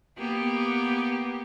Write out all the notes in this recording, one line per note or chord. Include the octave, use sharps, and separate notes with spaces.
A#3 B3 G4